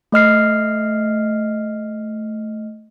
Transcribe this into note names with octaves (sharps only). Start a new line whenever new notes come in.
A3 D#5 F6 C7